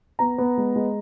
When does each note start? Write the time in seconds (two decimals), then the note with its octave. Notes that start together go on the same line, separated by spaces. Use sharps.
0.19 B3 A#5
0.38 B3
0.57 G#3
0.76 G#3